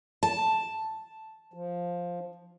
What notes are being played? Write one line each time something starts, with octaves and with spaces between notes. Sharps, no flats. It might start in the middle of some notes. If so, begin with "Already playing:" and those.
A5
F3